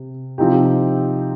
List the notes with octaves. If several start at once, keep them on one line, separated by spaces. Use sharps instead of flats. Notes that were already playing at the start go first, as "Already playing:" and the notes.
Already playing: C3
C3 F3 C4 D#4 G4